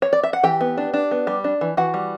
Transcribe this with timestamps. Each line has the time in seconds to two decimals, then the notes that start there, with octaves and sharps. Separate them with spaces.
0.02 C#5
0.13 D5
0.23 E5
0.33 F#5
0.43 E3 G4 G5
0.61 B3
0.78 D4
0.94 D4
1.11 B3
1.27 G3
1.44 D4
1.61 E3
1.77 E3 F#4 F#5
1.94 G3